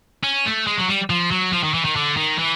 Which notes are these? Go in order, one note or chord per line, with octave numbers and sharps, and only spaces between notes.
C#4
A3
G#3
F#3
G3
F3
F#3
F3
D#3
E3
D#3
D3
D#3
E3